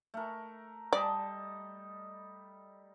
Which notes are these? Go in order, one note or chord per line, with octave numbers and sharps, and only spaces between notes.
A3 A#4
G3 D5 D#5 A5